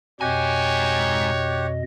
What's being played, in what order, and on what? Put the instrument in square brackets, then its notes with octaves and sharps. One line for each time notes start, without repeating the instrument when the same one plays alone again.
[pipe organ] F2 B2 D#5 [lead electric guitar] G#2 G#5 [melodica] G4 F#5 [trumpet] C#5